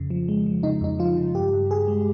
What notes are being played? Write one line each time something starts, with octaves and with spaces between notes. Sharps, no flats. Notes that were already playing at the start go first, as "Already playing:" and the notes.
Already playing: F2 C#3
F3
G#3
F3
C#3 D#4
F2 D#4
F3 F4
C#3
G2 G4
G2
G2 G#4
G#3